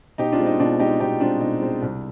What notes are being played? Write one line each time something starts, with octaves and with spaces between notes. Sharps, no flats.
B2 D#4 G4
D4 F4
G#3 C4
D#4
B2 D4 F4
G#3 C4 D#4 G4
B2 D#4 G4
G#3 C4 D4 F4
B2 D#4
G#3 C4
C2